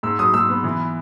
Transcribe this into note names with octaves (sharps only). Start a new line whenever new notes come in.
G#2 E6
F#3 D#6
G#2 E6
B3
E3